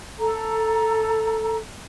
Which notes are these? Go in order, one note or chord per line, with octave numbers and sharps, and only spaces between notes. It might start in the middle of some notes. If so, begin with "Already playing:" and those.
A4 A#5